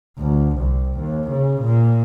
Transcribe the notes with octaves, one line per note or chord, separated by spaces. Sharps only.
D2
C2
D#2
C#3
A#2